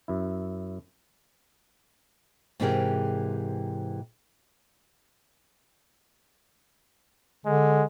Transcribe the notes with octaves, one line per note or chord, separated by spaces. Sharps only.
F#2 E4
G#2 C3 E3 G4 G#4 A#4
D3 G#3